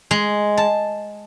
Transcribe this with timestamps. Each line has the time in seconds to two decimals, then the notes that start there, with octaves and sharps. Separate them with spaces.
0.11 G#3
0.58 A5